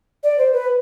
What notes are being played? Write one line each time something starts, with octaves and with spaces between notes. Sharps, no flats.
D5
C5
B4